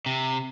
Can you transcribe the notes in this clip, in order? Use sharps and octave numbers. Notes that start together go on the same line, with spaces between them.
C3